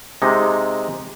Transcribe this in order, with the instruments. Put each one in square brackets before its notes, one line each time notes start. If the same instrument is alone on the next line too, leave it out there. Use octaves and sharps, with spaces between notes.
[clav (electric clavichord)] C3 G#3 D#4